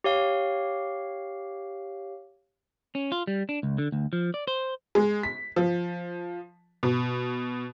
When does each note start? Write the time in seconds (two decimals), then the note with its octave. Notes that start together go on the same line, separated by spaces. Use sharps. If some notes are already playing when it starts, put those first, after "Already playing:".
0.04 G4 C#5 F5
2.95 C#4
3.12 F4
3.27 G3
3.49 D4
3.63 C#2
3.78 D3
3.92 D2
4.13 F3
4.34 D5
4.47 C5
4.95 G#3
5.23 B6
5.56 F3
6.83 B2